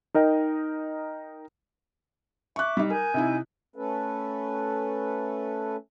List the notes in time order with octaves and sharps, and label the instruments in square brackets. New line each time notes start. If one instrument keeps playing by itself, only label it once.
[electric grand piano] D#4 A#4 D#5 G5
[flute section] E5 D6 [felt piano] C#6 F#6
[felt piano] G3 D#4
[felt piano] A#4 [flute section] G#5 D#6 G6
[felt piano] C3 D#4 E4
[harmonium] A3 C#4 A4 B4